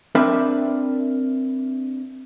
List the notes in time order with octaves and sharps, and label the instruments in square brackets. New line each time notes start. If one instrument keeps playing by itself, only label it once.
[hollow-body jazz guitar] C4 D4 A#4 B4 D5 E5